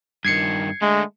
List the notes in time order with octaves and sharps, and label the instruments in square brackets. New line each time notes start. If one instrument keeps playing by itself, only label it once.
[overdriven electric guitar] G2 D#3 [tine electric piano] G#6 C7 C#7
[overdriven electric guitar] D3 A3 [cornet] G#3